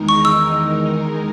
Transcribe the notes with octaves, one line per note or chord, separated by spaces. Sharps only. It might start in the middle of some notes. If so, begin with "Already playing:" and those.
Already playing: E2 D#3 G#3 D#4 A#4
C#6
E6